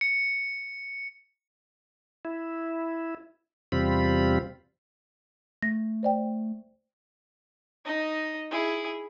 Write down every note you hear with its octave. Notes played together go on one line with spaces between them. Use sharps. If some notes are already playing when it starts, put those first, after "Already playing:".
C#7
E4
E2 C3 G3 C4 F4 B5
A3 A#6
C5 D5 G5
D#4 D#5
E4 G#4